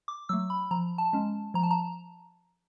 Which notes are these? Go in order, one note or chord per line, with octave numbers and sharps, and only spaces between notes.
D6
F#3 A3 E6
B5
F3 A#5
A5
G#3 C#4
F3 A#5
A5
A#5